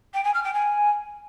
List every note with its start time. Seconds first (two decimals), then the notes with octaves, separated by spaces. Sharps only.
0.14 G5
0.24 G#5
0.34 F6
0.44 G5
0.54 G#5